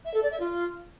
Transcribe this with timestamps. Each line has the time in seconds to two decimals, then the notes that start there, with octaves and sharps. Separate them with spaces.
0.05 E5
0.14 A4
0.22 D5
0.31 E5
0.40 F4